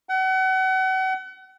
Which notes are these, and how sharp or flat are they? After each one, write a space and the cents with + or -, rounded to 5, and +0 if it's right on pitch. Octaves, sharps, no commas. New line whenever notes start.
F#5 +35